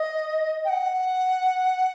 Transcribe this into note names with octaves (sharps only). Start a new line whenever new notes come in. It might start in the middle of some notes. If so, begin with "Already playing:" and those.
Already playing: D#5
G5
F#5